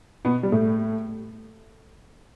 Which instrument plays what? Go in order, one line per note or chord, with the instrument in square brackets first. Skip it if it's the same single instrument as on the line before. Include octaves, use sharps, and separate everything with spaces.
[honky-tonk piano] B2 B3
G3
A2 A3